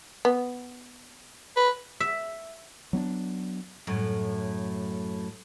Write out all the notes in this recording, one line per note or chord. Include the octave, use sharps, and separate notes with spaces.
B3
B4
E5
F#3 B3 C#4 D4
F#2 A2